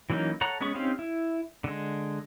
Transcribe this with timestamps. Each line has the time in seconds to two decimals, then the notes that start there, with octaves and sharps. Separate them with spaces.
0.10 E3 F#3 A#3 C#4 D#4
0.41 A4 C#5 F#5 A#5
0.61 G#3 B3 C#4 G#4 C#6
0.75 C4 C#4 D#4 G4 F5
0.99 E4
1.64 D3 G#3